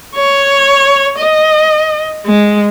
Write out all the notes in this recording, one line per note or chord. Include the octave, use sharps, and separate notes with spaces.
C#5
D#5
G#3